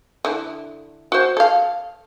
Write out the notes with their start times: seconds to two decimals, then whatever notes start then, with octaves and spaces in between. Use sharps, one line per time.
0.25 D3 E4
1.12 F#4 C5
1.37 A4 F5